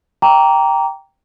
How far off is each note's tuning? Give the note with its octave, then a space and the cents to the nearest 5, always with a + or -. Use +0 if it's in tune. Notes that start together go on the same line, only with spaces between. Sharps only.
G5 +0 A#5 +0 D6 -25